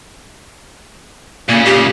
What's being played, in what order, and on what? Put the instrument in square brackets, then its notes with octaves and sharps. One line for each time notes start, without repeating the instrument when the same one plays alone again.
[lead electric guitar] A#2 C#3 [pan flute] A#3
[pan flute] G4